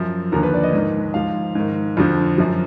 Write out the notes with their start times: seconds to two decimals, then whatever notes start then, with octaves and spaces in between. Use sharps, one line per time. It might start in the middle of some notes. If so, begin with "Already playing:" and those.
Already playing: F#2 F3
0.32 D#2 D3 F3 A#4
0.43 B4
0.54 D5
0.63 D#5
0.73 G#2 D#3
1.14 G#2 F3 F5
1.55 G#2 D#3
1.97 F2 D3 F3
2.38 F#2 F3